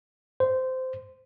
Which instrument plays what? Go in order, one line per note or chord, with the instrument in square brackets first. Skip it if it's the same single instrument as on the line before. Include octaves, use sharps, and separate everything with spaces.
[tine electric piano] C5